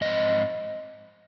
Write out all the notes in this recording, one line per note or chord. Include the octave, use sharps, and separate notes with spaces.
G#2 F3 C4 D#5